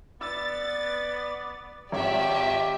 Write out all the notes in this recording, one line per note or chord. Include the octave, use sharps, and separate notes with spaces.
B3 D5 E6 A6
G#1 F4 G4 C#5 D5 E5